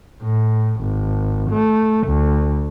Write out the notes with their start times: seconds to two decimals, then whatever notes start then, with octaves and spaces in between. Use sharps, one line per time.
0.22 A2
0.81 G#1
1.50 A3
2.07 D2